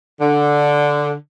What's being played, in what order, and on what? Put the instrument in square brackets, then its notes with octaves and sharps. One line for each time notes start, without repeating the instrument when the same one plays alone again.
[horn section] D3